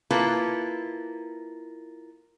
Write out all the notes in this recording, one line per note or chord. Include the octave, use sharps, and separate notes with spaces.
A#3 E4 F4 A4 B4